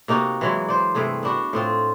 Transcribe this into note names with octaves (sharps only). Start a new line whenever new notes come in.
C3 A#3 D#4 F#4
E3 F#3 G#3
C5 D5
G2 C3 A3 G#4
B3 D4 F#4
A2 C4 F4